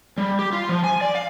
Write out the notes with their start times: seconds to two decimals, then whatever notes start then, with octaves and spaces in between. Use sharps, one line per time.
0.18 G3
0.39 G4
0.53 F4
0.69 F3
0.84 G#5
1.01 D5
1.15 F5